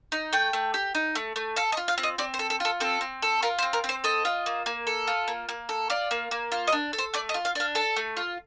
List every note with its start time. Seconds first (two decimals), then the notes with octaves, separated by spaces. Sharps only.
0.12 D#4
0.33 A3 G5
0.53 A3
0.74 G4
0.95 D#4
1.15 A3
1.36 A3
1.56 A4 F5
1.72 D#5
1.77 F4
1.88 F5
1.98 C4
2.03 D#5
2.18 C4 D5
2.34 C5
2.39 A4
2.50 A4
2.60 F4 A4
2.80 C4 A4
3.01 C4
3.22 A4
3.42 F4 A#4
3.59 C5
3.63 C4
3.73 A#4
3.84 C4
3.89 C5
4.04 A4 D#5
4.25 F4
4.46 A#3
4.66 A#3
4.87 A4
5.07 F4
5.28 A#3
5.49 A#3
5.69 A4
5.90 F4 D5
6.11 A#3
6.31 A#3
6.52 F4
6.67 D#5
6.72 D4
6.93 A4
6.98 C5
7.14 A3 D5
7.29 D#5
7.34 F4
7.45 F5
7.55 D4 F5
7.75 A4 A5
7.96 A3
8.17 F4